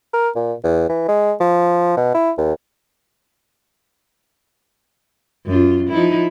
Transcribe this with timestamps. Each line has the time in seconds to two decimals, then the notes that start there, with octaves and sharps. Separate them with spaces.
0.14 A#4
0.35 A#2
0.64 E2
0.89 E3
1.09 G#3
1.40 F3
1.97 B2
2.15 E4
2.38 D#2
5.46 F#2 F4
5.89 F3 D#4 E4